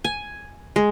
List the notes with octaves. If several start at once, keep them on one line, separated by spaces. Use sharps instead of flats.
G#5
G#3